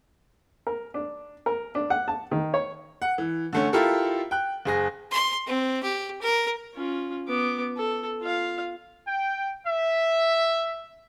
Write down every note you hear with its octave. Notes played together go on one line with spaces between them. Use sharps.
A#4
D4
A#4
D4
F#5
A5
D#3
C#5
F#5
E3
D3 A3 C#4
E4 F4 G4 A4 A#4
G5 F#6
F#1 G#4 A#6
C6
C4
G4
A#4
C#4 F4
B3 D6
A4
F4 F5
G5
E5